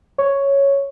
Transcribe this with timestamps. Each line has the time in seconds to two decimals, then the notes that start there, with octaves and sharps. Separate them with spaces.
0.18 C#5